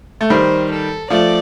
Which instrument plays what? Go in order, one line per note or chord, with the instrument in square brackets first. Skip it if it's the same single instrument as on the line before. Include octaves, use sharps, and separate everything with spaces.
[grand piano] A3
[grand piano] D#3 G3 [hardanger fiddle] C5
[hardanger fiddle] A4
[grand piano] F3 A3 [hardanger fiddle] D5